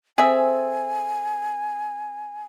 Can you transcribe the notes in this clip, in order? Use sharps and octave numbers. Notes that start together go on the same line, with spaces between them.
C4 G#4 A4 E5 G#5